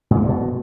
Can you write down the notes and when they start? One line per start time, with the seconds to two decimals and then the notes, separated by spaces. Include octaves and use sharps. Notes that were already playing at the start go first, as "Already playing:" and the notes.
0.11 G#2
0.17 E3
0.23 G2
0.29 B2